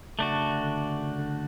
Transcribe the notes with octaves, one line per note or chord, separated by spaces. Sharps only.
C#3 A3 D4 F#4
C#3
D3
D3
C#3
D3